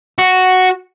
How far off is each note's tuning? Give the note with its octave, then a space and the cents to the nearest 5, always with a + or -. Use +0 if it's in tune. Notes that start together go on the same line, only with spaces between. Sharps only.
F#4 +0